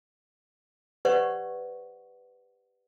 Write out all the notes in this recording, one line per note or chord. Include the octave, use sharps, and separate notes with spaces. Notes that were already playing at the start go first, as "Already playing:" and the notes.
G4 B4 C5 D5 F#5 C#6